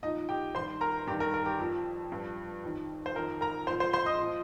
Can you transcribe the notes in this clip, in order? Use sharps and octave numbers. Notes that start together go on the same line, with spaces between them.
A#2 F3 D#4 D#5
G4 G5
G2 D#3 C5 C6
A#4 A#5
G2 D#3 G4
A#4
A#4
G4
F2 F3
G2 F3
F2 D#3
C5
F2 D#3 A#4
A#4 A#5
A#2 F3 C5 C6
C5 C6
C5 C6
D#5 D#6
A#2 F3